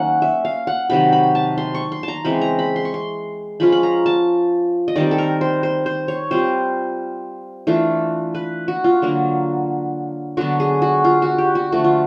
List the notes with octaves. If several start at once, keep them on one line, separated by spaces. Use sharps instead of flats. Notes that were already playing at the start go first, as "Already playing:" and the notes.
Already playing: D#3 F#3 A#3 C#4 F#5
E5
F5
F#5
C3 D#3 F#3 B5
B5
A5
C6
C#6
C6
A5
A#5
C#3 E3 G#3 C4 B5
A#5
B5
C6
C#6
C6
F3 G#3 C#4 F4 B5
B5
A#5
A5
D#5
D#3 G3 C4 D5
A4
A#4
C5
C5
C5
C#5
G3 C4 F4 C5
E3 A3 D4 F4
B4
F#4
F4
D3 F#3 A#3 D4
D3 F#3 B3 D4 F#4
G#4
F#4
F4
F#4
G4
F#4
D3 F3 A3 F#4
F4